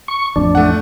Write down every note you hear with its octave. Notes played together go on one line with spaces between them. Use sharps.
C#6
A1 F2 D4
A3 F#5